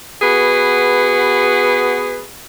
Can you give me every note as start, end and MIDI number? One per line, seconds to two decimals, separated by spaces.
0.22 2.25 59
0.22 2.25 66
0.22 2.25 68
0.22 2.25 71